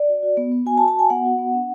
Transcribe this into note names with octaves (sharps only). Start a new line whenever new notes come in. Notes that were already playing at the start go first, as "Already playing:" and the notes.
Already playing: D5
F#4
F#4
B3
B3
F#4 G#5
A5
F#4
A5
F#4 G#5
B3 F#5
F#4
B3
D4